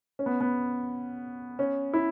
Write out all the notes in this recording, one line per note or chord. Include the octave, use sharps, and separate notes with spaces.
C#4
B3
B3
C#4
E4